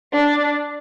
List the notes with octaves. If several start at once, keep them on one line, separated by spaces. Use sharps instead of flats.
D4